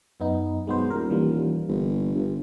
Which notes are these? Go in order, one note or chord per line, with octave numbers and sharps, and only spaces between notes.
F#2 B3 D#4
B1 G#3 B3 C5
D#1 A#4
E3 G3 A#3
G1
G1